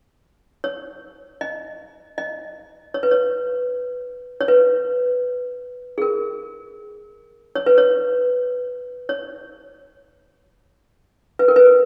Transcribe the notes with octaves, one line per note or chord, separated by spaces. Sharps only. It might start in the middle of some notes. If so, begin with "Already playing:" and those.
C#5
D#5
D#5
C#5
B4
C#5
C#5
B4
G#4
A#4
C#5
B4
C#5
C#5
B4
A#4
B4